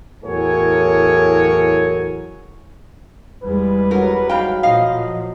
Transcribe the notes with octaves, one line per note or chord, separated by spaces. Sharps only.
E2 A2 F#3 A#4 C#5 G#5
E2 G3 G#3 B4
F#3 F#4 A#4
G#2 F5 G5 B5
A#2 F3 D#5 F5